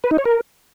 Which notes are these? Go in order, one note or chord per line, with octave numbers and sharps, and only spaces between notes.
B4
D#4
C#5
A#4